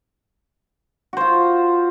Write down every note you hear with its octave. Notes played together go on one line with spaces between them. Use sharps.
F4 F#4 C5